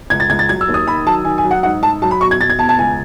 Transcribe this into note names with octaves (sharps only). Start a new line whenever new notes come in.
C#2 G#6
A6
C#2 G#6
A6
F#3 G#6
E6
D#2
D#6
D#3 B5
F#3 A5
D#3 G#5
G#5
F#3
F#5
G#2 F#5
G#2 A5
F#3 A5
B5
B2 C#6
G#6
B2 A6
G#6
E2 A5
A5
C#2 G#5